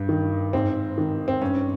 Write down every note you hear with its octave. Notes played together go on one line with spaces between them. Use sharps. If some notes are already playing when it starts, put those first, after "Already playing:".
Already playing: G2
D#3
G#2 C4
D#3
C4
G2 C#4